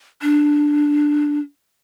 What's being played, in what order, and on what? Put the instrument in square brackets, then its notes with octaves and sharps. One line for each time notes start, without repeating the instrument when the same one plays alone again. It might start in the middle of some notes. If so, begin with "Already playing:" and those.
[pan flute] D4